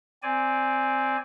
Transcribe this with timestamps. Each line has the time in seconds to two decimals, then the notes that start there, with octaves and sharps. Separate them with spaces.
0.23 C4 D5 G#5